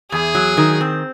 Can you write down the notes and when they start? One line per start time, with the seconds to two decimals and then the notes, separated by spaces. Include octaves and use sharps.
0.12 E2 G#4
0.35 F#3
0.57 D#3
0.81 C4